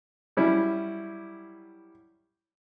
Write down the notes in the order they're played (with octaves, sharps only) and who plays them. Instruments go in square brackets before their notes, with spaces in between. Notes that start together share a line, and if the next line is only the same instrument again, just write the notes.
[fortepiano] F#3 G3 C#4 E4